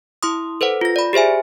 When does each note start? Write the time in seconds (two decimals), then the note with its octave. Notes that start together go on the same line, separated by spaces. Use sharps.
0.23 E4 C6 D#6
0.61 A4 B4 C5 F#5
0.81 F4 A#6
0.96 D5 B5
1.13 G4 G#4 C5 E5 G#5